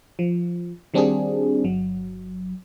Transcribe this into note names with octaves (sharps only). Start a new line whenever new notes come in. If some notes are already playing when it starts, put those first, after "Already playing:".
F3
D#3 G3 C4 D4 F#4 G#4
G1 F#3